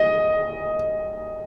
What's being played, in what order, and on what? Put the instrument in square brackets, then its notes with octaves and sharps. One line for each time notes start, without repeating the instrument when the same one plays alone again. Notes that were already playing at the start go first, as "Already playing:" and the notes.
Already playing: [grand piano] D#5